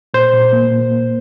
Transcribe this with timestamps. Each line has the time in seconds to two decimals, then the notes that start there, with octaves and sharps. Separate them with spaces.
0.14 A#2 C5
0.33 A#2
0.53 A#3
0.72 A#2
0.91 A#3